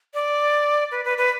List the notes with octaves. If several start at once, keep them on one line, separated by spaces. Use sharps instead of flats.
D5
B4
B4
B4